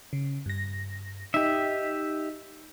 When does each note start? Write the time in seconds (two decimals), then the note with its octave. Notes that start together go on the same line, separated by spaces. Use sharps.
0.13 C#3
0.46 G2 A#6
1.34 D#4 G4 D#5 E5